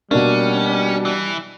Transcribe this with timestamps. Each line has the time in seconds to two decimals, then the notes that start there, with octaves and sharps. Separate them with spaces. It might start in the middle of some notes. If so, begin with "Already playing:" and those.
0.11 B2 G3 A#3 C#4 D4
1.05 E3